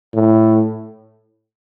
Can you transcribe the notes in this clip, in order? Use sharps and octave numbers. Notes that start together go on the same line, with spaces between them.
A2